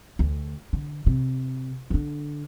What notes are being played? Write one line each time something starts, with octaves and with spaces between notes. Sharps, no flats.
D2
D3
C3
D3 D4